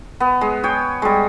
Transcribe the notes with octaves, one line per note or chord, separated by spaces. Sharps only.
B3
G#3
C#5 G5
G3 G#3